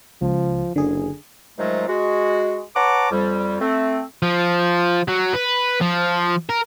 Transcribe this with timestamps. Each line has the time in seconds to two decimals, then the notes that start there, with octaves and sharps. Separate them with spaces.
0.22 C#2 F3
0.76 F#1 D3 G#4
1.59 G#2 D#3 F3 F#3 G#3 A3
1.88 G#3 F#4
2.75 B4 C#5 F#5 A5 A#5 D6
3.11 F2 G3
3.61 A3 C4
4.22 F3
5.08 F#3
5.34 B4
5.81 F3
6.49 A#4